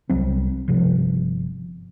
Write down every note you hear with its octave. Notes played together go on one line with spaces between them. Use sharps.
C2 F#3 C4
G1 C3 F3